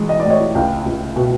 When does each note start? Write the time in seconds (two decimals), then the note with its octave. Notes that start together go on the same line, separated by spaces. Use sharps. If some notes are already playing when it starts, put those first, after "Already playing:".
Already playing: A1 G#3
0.09 D#5
0.20 D5
0.25 A2
0.30 C#5 D#5
0.55 C#2 F5 G5
0.86 C#2
1.16 B2